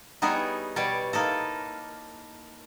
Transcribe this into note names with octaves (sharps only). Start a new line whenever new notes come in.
G3 B3 D#4 E4 G#4 C#5
B2 G3 C#5 D5
A#3 D#4 E4 A4